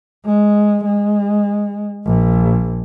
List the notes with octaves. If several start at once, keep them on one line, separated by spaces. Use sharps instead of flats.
G#3
G#3
A#1